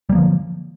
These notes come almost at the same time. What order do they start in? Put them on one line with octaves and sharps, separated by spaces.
G3 A#3 F3 D3